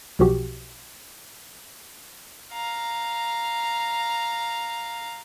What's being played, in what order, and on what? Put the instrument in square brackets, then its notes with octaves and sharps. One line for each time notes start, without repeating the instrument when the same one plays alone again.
[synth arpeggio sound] B1 B2 F3 F#4 G4
[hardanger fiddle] F5 A#5